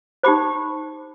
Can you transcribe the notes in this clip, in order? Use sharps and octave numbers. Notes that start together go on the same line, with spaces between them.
D#4 G4 C5 B5 D6